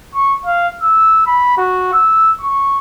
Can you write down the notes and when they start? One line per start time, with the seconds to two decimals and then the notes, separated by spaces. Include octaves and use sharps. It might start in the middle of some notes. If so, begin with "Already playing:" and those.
0.15 C#6
0.46 F5
0.82 E6
1.27 B5
1.58 F#4
1.93 E6
2.41 C#6